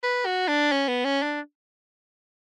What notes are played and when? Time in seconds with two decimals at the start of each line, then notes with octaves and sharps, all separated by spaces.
0.03 B4
0.26 F#4
0.48 D4
0.72 C#4
0.88 B3
1.05 C#4
1.23 D4